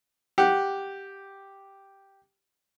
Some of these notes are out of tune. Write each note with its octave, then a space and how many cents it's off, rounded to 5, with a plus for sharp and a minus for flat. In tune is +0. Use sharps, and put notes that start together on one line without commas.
G4 +0 F#5 +0